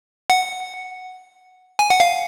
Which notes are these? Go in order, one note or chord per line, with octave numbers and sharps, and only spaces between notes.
F#5
G#5
F#5
F5